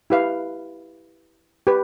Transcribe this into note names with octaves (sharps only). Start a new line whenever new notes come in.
E4 G4 B4 F5
G4 B4